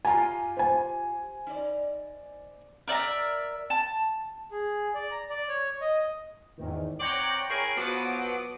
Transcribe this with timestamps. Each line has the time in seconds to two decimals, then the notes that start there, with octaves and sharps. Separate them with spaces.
0.05 F4 G4 G#5 A#5
0.57 C5 G#5
1.47 D#4 D5
2.88 A#4 D5 E5 A#5
3.70 A5
4.51 G#4
4.95 D5
5.11 A#5
5.30 D5
5.49 C#5
5.81 D#5
6.58 E2 G#2 D#3
7.00 C4 C#5 D5 F#5 G5 A#5
7.50 E4 G#4 A#4
7.77 F3 F#3 B3 F#4 D6 D#6